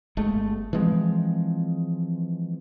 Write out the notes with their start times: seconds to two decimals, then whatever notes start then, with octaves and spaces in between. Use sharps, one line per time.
0.17 G1 G#3 A3
0.73 E3 F3 G#3 C4